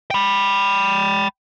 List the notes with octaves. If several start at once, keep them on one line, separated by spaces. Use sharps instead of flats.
G5 B5